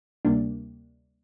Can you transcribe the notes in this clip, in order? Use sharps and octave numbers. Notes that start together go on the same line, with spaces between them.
D2 C3 G3 A#3 D4